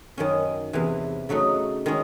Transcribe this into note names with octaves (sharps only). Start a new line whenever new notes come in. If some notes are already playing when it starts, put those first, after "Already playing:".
F#2 D#3 F#3 C#4
E2 C3 E3
C#3 F#3 A3 D#4 F#4
D#3 G#3 C#4